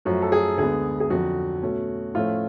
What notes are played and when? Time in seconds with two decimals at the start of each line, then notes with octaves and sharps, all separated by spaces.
0.05 F#2 F3 A3 C#4 F#4
0.22 A4
0.32 G#4
0.58 D2 D3 G#3 B3 G#4
1.00 G#4
1.10 F2 D3 F#3 F#4
1.63 B2 A3 C#4
2.14 A2 F3 A3 C#4 F4